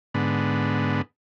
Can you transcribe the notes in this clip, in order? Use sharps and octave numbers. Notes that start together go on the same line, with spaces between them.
G#2 D3 B3